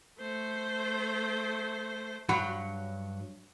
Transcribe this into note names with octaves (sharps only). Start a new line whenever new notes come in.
A3 C5
G2 F#3 F#5 B5